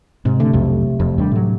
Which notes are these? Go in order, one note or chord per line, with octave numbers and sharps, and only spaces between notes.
G#2 C3
D3 A3
B1 F2
E1 F2
D#2 G3 D4
A2 F#3